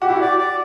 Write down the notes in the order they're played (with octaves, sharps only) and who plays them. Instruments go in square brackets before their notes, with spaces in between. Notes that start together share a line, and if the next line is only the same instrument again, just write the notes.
[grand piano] F#4 [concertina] G4
[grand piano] E4
F#4
[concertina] D5
D5